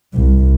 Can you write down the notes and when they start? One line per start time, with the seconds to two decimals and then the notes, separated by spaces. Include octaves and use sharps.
0.13 C2